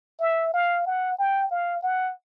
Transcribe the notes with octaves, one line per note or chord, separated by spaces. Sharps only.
E5
F5
F#5
G5
F5
F#5